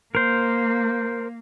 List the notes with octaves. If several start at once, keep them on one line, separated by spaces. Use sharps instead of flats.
A#3 A#4 C5